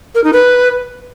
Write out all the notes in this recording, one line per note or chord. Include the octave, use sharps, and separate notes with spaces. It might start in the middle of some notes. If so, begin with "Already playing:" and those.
A#4
D#4
B4